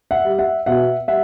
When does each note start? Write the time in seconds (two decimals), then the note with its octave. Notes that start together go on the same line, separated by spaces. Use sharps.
0.11 E5 F#5
0.25 G3
0.39 E5 F#5
0.66 B2 E5 F#5
1.08 G3 E5 F#5